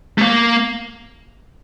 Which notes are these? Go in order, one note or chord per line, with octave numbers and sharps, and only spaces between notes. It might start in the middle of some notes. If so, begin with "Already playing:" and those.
A3
A#3